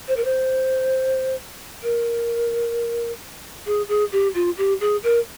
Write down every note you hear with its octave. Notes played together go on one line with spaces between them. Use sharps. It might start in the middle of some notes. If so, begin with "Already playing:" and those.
C5
A#4
C5
A#4
G#4
G#4
G4
F4
G4
G#4
A#4